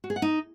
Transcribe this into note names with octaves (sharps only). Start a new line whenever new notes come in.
F#4
G#4
F#5
D#4